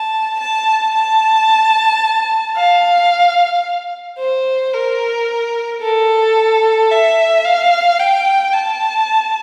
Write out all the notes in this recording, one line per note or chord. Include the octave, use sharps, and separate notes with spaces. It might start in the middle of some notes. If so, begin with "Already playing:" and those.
Already playing: A5
A5
A5
F5
C5
A#4
A4
E5
F5
G5
A5